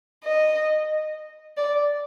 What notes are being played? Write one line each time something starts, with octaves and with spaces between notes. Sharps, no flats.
D#5
D5